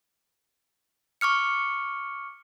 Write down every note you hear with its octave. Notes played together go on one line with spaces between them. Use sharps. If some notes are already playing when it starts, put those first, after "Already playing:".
C#6 D6 F6 C#7